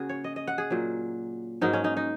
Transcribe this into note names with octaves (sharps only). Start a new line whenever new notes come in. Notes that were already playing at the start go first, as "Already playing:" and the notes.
Already playing: C#3 A#3 F#4 G#4
C#5
D#5
D#5
F#5
G#4
A#2 F#3 A#3
G#2 F#3 A#3 D#4
C#4
D#4
D#4